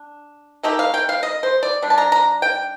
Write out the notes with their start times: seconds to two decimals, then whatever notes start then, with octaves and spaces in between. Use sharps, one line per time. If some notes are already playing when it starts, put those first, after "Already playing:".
Already playing: D4
0.63 D#3 A3 D#4 G4
0.79 F5
0.94 G5
1.09 F5
1.23 D#5
1.43 C5
1.63 D5
1.82 G3 D4
1.90 A5
1.98 A#5
2.12 A#5
2.42 G5